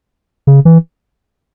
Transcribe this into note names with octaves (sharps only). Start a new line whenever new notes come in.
C#3
E3